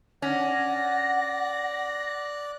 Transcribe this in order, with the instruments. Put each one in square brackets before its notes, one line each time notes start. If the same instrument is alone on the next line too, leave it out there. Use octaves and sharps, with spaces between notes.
[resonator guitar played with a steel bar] C#4 [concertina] D5 F#6 [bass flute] F#5 [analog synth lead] A#6